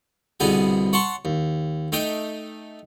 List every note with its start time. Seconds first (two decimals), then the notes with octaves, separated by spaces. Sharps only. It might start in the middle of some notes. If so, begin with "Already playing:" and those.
0.40 C2 B2 D3 B3 G#4 G#5
0.93 C#5 F#5 A5 C6 C#6
1.25 D#2
1.92 A3 D#4 G5 D#6